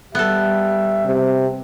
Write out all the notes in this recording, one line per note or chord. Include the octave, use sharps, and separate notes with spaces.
G3 B3 A4 E5
C3